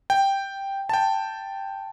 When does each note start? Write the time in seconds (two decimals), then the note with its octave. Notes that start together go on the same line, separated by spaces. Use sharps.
0.10 G5
0.89 G5 A5